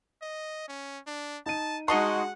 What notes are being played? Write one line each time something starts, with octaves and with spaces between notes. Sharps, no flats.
D#5
C#4
D4
D#4 A5 D#7
G#3 D#4 F#4 D#5 F#5 A5 C6 C#6